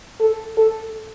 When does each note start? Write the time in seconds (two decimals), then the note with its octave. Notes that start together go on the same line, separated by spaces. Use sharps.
0.20 A4
0.57 A4